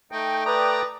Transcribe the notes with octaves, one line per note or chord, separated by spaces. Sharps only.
A3 D#4 G5
B4 D5 A#5 D#6